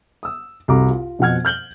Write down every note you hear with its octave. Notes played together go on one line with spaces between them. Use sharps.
D#6 E6
C2 C3 F#4 A4 A#5 D6
F4
F2 B2 C4 F#5 F6 G#6
F6 G6 F#7 G7